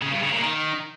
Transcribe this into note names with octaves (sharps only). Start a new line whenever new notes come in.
C#3
G2
C#3
A#2
D#3